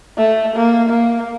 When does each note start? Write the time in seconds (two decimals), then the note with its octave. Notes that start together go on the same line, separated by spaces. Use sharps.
0.17 A3
0.56 A#3
0.89 A#3